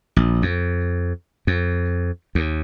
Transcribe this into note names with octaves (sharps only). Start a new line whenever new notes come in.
A#1
F2
F2
D#2